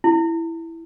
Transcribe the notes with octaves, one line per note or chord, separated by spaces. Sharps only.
E4